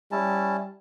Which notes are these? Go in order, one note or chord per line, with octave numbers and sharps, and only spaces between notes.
G3 C#4 E4 A5